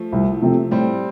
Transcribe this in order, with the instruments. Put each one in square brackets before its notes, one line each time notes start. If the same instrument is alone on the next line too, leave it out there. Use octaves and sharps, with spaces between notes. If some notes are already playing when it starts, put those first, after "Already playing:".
Already playing: [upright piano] F3 A3
[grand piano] C2
C3 F3 A3 C4
[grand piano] A2 [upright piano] G3 C4